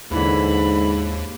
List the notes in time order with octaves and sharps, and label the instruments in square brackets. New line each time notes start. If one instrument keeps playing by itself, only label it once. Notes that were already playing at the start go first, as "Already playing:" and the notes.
[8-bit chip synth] D#2 [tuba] G#2 [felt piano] D3 E3 [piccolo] B5